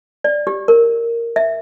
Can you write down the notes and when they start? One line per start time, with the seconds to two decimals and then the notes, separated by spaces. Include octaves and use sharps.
0.24 D5
0.47 G4
0.68 A#4
1.36 E5